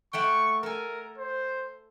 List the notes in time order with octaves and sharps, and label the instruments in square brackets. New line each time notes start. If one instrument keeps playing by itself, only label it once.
[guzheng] A3 F#5 G5 [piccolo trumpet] C#6
[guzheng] A4 G#5 [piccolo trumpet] A#4
[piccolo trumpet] C5